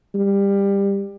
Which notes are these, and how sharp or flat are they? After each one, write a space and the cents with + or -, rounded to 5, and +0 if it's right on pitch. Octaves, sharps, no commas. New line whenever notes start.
G3 +20